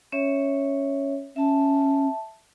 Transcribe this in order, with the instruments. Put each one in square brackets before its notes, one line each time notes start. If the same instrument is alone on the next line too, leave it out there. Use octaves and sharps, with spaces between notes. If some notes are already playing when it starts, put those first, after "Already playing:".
[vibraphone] C#4 C#5 E5
[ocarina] C#4 [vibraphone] E5 A5